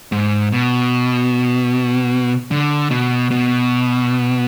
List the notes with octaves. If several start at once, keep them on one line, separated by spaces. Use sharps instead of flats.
G#2
B2
D3
B2
B2